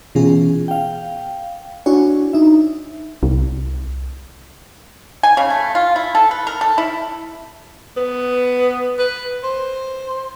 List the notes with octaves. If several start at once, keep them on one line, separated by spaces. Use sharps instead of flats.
B2 E3 B3 C#4 F4 G#4
F5 G5
D4 E4 F#4 C#5 G#5
D#4 E5
C2
G#5
C#3
A3
F4
E4
A4
B4
A#4
A4
E4
B3
B4
C5